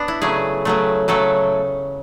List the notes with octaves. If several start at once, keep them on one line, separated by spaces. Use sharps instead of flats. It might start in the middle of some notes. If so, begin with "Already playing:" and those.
Already playing: B3 D4
E4
C#3 F#3 A3 G#4
C#3 F#3 A3
C#3 F#3 A3 A4